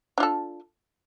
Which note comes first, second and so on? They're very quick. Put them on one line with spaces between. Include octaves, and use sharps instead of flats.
D4 F4 A4